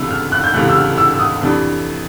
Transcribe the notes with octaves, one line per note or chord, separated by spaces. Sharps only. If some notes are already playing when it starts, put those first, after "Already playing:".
Already playing: C#2 C3 E3 A3 E6
F6
F#6
G6
C#2 C3 E3 A3 F#6
E6
F6
E6
E6
D#6
F2 C3 E3 A3 D4